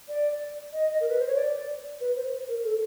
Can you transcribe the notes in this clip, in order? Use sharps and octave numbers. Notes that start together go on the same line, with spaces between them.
D5
D#5
A#4
B4
C5
C#5
D5
B4
C5
A#4
A4